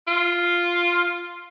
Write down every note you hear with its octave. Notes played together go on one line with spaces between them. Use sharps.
F4